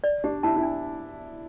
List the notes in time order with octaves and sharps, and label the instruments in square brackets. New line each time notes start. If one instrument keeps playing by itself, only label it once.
[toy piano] D5
[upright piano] D4 [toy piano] G4
[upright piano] E4 [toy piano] A5
[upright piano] E4
[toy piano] D4